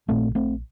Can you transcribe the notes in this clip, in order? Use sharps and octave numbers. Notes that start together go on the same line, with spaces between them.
A#1 A#2 A3 C4
A3 C4